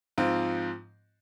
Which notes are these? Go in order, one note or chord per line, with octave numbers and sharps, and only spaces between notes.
G#2 F3 C4 F4